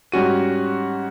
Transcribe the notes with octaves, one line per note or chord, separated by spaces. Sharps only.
G#2 G3 C#4 F#4 D#7